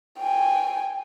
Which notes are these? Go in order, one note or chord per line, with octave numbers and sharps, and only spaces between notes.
G5 G#5